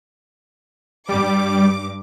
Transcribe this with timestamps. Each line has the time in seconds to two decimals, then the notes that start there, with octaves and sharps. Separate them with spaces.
1.09 G2 G3 D6